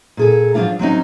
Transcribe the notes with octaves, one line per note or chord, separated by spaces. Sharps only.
A#2 G#4 A4
F3 F#3 A#3 D4 F4 F5
F#3 C4 C#4 D#4